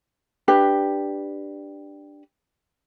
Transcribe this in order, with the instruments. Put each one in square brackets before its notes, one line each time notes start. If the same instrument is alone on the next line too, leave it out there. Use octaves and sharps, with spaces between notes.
[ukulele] D4 G4 B4